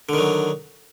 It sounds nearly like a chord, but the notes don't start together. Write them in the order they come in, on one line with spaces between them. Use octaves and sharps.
D3 D#3 F#3